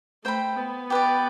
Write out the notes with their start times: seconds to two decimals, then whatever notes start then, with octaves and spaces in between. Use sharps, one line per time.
0.25 A3 C5 G5 B5
0.57 B3
0.90 G4 B4 D5